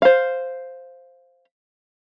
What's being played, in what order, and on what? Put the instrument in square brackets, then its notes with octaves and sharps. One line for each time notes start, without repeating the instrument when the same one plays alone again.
[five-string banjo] C5 F5